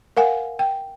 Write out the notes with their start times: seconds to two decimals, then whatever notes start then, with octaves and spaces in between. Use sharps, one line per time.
0.17 A#4 F5 F#5 G#5
0.59 G5